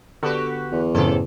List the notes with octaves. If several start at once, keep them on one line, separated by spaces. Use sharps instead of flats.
D3 B3 F#4 G4 A4 B4
E2
F#2 A2 C#3 E3 C4 A4